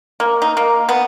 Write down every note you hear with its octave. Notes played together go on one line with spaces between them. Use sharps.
A#3
D#4
A#3
B3